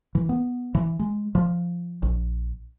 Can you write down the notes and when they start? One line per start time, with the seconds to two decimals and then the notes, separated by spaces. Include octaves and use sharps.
0.15 E3
0.29 B3
0.75 E3
0.99 G#3
1.35 F3
2.03 A#1